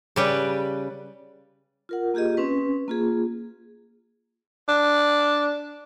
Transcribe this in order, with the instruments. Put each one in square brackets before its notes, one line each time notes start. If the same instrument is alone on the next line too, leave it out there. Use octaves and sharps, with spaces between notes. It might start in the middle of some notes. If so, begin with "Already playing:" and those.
[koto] C#3 G3 B4
[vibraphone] F4 A#4 F#5
A#3 F4 G4 G#4 D#5
C4 C#4 B4
A#3 F4 G#4
[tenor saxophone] D4